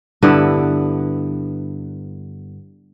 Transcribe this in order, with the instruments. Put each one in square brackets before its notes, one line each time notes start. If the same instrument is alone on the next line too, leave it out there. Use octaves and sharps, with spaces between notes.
[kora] G2 D3 B3 E4